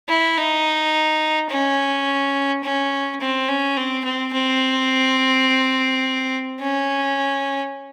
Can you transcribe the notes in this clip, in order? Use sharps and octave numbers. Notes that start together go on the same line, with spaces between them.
E4
D#4
C#4
C#4
C4
C#4
C4
C4
C4
C#4